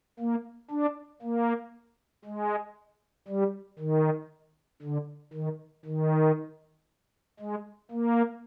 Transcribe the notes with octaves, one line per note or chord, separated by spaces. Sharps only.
A#3
D4
A#3
G#3
G3
D#3
D3
D#3
D#3
G#3
A#3